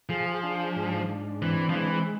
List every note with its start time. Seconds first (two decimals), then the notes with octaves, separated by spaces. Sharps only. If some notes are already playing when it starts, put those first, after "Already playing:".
0.09 F3 G#4
0.43 D4
0.76 G#2
1.09 D4
1.41 E3 C4
1.69 F3
1.75 E3 G#3